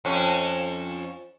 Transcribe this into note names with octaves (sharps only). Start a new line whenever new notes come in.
F2 C#4